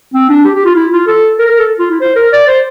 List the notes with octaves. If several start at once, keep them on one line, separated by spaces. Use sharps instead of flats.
C4
D4
G4
G4
F4
E4
F4
A4
A#4
A#4
A4
F4
E4
C5
A#4
D5
C5